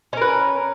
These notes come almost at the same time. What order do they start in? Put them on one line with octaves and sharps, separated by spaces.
C#4 A#4 B4